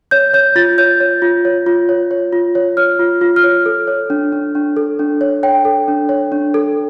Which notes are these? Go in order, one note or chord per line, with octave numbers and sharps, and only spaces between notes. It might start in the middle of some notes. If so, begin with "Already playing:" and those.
C#5 G6
C#5 G6
F4 A6
C#5 G6
C#5
F4
C#5
F4
C#5
C#5
F4
C#5
C#5 F6
F4
F4
F6
C#5
A4
C#5
D4
D4
D4
A4
D4
C#5
C#5 G5
A4
D4
C#5
D4
A4